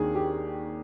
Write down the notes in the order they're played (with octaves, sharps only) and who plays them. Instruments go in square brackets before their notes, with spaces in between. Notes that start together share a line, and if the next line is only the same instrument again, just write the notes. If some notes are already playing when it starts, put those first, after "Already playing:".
Already playing: [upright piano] D#2 D#3 D4 G#4
G4